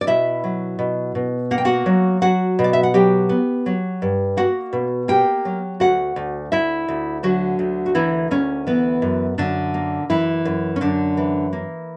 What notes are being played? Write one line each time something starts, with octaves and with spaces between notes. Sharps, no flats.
D5
B2 E4 E5
F#3
B2
B2
A#3 F#5
G5
F#4 F#5
F#3
F#3 F#4 F#5
B2
D5
E5
F#5
F#3 G4 G5
B3
F#3
G2
A#3 F#4 F#5
B2
A#3 G4 G5
F#3
D2 F#4 F#5
D2
D2 E4 E5
D2
D3 F#3 F#4
D2
F#4
E3 A#3 E4
D2 C#4
E3 B3
F#2
F#2 D3 D4
A#3
F#2 E3 E4
F#2
C#4
F#2 D3 D4
E3
A#3